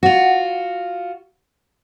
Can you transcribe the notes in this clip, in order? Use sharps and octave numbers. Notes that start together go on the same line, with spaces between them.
F4 F#4